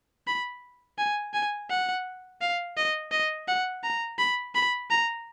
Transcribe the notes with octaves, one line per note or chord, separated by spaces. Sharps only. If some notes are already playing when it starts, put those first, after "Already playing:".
B5
G#5
G#5
F#5
F5
D#5
D#5
F#5
A#5
B5
B5
A#5